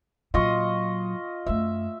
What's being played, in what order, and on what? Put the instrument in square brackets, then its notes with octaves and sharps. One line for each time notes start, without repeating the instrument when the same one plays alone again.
[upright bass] A#2 F#3 [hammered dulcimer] F4 D#5 C#6
[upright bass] F#2 A3 [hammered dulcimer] E5